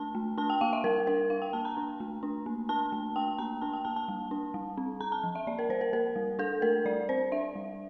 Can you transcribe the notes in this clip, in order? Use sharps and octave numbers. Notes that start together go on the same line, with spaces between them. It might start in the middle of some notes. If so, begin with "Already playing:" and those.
Already playing: A3 D4 A5
A3
D4 A5
G5
A#3 F5
E5
G3 A#4
D4 A#4
D4 F5
G5
A#3 A5
A#5
D4
A3
D4
A#3
D4 A5
A3
D4 G5
A#3 A#5
D4 A5
G5
A#3 A5
A5
G3
D4
G3
C4
C4 A#5
A5
F3
E5
A#3 D5
A#4
G3 C5
A#4
A#3 A#4
G3
D4 A4
A3 A#4
G3 D5
C4 C5
D4 E5
G3